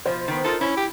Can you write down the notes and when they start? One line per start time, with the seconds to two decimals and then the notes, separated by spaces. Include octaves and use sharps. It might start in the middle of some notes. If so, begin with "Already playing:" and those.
0.06 B2 F3 C5
0.28 D#3 B3
0.44 D#4 F4 A4 A#4
0.61 C#4 E4
0.77 G4